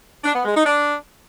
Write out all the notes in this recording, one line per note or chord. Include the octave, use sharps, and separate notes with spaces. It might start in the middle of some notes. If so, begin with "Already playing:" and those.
D4
B3
G#3
D#4
D4